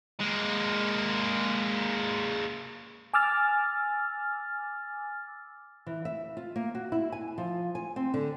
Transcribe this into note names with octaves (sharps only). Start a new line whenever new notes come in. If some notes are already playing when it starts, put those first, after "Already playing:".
G#3 A#3
G#5 D6 E6 F6 A6
E3
E5
F4
A#3
F#4
E4
G#5
F3
G#5
C4
D3